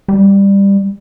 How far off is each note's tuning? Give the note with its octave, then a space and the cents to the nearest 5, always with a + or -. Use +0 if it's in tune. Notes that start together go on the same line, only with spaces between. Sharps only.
G3 +15